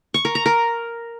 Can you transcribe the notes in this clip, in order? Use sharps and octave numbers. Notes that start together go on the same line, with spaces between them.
C#6
A#4
A#5
A#4